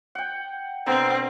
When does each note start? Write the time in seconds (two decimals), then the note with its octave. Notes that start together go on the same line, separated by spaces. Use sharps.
0.15 F#5 G5
0.86 B2 D3 C4 A#5